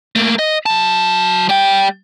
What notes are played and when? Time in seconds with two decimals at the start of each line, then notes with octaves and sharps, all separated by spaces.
0.16 A3 A#3
0.39 D#5
0.66 F#3 A5
1.49 G3 G5